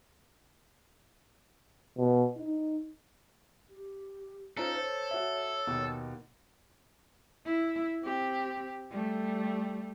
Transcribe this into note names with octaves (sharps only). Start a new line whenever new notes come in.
B2
D#4
G4
C#4 D#4 F4 A4 C5
C5 C#5
F#4 E5
D#2 B2
E4
C4 G4
G3 A3